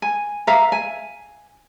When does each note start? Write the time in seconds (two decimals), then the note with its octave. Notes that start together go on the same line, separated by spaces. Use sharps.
0.02 G#5
0.47 E5 F5 A#5
0.72 G#5